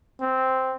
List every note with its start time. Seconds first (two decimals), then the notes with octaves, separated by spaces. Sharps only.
0.21 C4